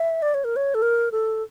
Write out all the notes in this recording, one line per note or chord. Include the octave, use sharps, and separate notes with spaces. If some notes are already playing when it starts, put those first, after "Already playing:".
Already playing: E5
D5
C#5
A#4
C#5
A4
A#4
A4